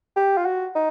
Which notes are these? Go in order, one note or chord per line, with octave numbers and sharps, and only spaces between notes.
G4
F4
F#4
D#4